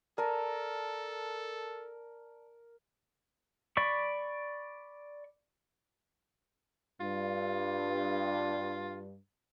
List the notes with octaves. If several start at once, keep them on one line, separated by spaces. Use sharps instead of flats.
A4 A#4 D5 A5 A#5
D5 B5 C#6
G2 F4